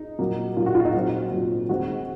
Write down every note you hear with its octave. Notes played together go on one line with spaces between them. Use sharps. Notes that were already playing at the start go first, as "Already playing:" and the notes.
Already playing: D#4
A#2 F#3 A#3
A#2 F#3 A#3 F4
F#4
F4
D#4
A#2 F#3 C4
A#2 F#3 C4
D#3 G#3 C4 F#4